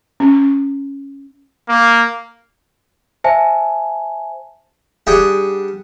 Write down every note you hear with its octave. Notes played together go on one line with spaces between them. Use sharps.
C#4
A#3
C5 E5 G#5 A5
G3 D4 G#4 F#5 G5